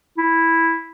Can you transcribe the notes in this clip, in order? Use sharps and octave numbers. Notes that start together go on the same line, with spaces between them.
E4